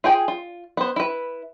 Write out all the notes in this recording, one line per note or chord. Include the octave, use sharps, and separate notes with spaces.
F4 G#4 G5 G#5
F4
B3 C5
E4 B4